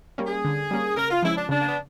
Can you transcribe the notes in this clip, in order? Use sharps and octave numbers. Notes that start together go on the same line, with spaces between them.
G3 A#3 C#4
G#4
D3
G3 A#3 C#4
C#3 A#4
F4
F3 G#3 C#4 E4
D4
C#3 D4
A#3
B3